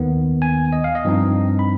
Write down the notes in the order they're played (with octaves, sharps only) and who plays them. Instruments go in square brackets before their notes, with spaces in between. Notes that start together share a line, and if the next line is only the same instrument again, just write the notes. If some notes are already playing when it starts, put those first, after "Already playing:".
Already playing: [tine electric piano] D#2 D#3 B3
G#5
D#5
F5
D#5
G2 F3 C4 D#4
B5